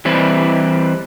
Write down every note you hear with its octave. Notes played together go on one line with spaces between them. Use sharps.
E3 G3 C4 E4